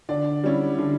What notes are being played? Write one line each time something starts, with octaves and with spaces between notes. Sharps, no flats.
D3 D5
G3 C#4 E4
D3